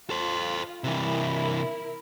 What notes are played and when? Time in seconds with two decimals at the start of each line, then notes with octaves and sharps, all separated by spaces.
0.10 F4 A4 C5
0.84 C3 E3 E4 A#4